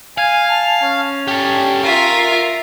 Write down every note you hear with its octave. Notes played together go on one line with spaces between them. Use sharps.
F5 G#5
A5
C#4
G4 A4
F4 A#4 E5